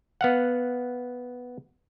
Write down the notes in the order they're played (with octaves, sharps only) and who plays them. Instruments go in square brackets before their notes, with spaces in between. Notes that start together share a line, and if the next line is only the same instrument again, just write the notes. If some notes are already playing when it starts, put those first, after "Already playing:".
[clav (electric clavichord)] B3 F5 F#5